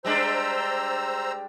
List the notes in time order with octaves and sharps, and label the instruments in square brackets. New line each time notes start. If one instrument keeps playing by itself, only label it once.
[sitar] G3 G#3 D4 [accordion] C5 A#5 E6